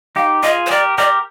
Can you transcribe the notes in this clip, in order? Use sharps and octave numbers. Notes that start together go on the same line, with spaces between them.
D#4 G4 F5
F4 G#4 D#5
C5
G4 A#4 D5
G4 A#4 D5